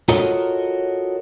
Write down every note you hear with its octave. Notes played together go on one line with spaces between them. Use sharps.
F4 F#4 A4 A#4 C#5 D#5